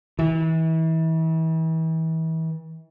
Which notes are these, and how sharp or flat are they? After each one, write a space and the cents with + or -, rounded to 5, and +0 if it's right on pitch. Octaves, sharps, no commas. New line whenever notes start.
E3 -35